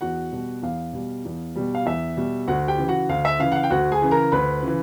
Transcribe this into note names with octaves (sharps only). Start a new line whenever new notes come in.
E2 F#4 F#5
B2 G3
E2 F5
B2 G3
E2
B2 G3
F5
E2 E5
B2 G3
D2 F#4 F#5
G4 G5
C#3 E3
F#4 F#5
D2 F5
E5
C#3 E3 F5
F#5
F5
G5
D2 F#4 F#5
G#4 G#5
C#3 E3
A#4 A#5
D2 B4 B5
C#3 E3